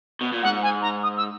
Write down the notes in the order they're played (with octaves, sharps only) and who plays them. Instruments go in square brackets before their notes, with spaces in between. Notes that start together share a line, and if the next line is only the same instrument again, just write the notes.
[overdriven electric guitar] B2
A#2
[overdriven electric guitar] G#2 [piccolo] F#5
[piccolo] G#5
A#5
D#6
E6